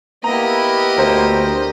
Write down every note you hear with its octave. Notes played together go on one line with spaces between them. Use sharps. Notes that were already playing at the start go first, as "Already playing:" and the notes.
A#3 B3 E4 G4 D#5 A#5
D2 A#4 C5